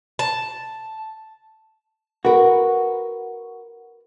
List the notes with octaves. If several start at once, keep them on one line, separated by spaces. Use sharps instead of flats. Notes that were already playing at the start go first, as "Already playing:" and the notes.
A5
F#4 A#4 B4